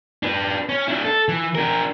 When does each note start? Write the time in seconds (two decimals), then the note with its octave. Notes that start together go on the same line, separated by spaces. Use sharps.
0.23 D4 B4
0.69 C#4
0.88 D4 E4
1.05 A4
1.28 E3
1.55 D4 A#4